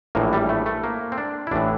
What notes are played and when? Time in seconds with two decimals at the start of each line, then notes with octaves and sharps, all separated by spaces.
0.15 A#1 A2 E3 A#3
0.33 G3
0.49 A3
0.66 A3
0.84 A#3
1.12 C4
1.18 D4
1.47 E4
1.51 A1 A2 E3 D4